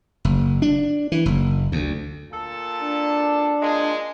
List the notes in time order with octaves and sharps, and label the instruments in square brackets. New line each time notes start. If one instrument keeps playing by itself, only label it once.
[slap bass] F#1
D4
E3
F#1
D2
[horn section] A#2 A4 A5
[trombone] D4
[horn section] A#2 G#3